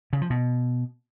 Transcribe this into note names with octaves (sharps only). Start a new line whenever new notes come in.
C#3
F3
B2